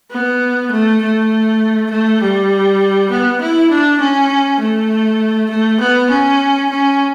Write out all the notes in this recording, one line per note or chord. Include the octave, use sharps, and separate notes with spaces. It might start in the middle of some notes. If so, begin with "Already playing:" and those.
B3
A3
A3
A3
G3
B3
E4
D4
C#4
A3
A3
B3
C#4
C#4